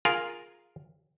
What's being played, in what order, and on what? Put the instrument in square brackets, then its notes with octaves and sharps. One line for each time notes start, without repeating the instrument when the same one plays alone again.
[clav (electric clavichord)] F4 G#4 A#4 F5